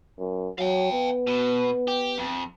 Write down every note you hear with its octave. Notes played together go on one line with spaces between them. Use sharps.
F#2
F#3 F5 G5
B3
B2
G4
F2